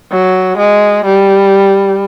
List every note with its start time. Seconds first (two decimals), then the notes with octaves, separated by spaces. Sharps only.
0.11 F#3
0.58 G#3
1.05 G3